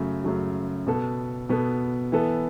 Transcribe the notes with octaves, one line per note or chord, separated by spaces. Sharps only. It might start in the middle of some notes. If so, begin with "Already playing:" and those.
Already playing: F#2 C#3 A3 F#4
F#2 C#3 A3 F#4
B2 B3 A4
B2 B3 A4
E3 B3 A4